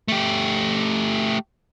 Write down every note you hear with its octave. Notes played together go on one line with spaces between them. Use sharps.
A3 G4